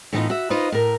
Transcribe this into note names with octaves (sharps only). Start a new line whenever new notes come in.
A2 E3 G3 B3 D#4 F4
F#4 E5
D#4 F4 B4 C5 D#5
A2 A#4